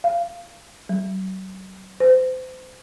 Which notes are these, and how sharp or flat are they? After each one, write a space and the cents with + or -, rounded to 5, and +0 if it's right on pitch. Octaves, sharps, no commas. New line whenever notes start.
F5 -25
F#3 +40
C5 -30